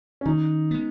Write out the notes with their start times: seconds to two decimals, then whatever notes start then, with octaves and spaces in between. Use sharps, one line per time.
0.21 C#4
0.26 D#3 D#4
0.71 G#3 B3